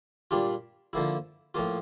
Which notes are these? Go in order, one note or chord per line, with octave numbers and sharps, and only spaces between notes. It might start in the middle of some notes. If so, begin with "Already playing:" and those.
A#2 G3 D4 F4
D3 F3 A#3 E4
A2 F3 A#3 F4